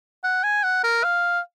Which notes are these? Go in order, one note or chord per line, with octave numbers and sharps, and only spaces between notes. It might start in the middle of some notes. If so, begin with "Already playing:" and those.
F#5
G#5
F#5
A#4
F5